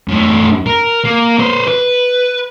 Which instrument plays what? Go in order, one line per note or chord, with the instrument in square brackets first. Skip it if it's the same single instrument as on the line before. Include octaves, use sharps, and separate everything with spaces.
[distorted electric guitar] F#2 A3
A#4
A#3
B4 C5
B4